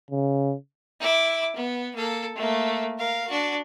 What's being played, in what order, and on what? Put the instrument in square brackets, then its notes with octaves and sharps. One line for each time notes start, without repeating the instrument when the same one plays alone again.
[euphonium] C#3
[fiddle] E4 D6
B3
A#3 A4
A3 A#3
A#4 F5
D4 F#4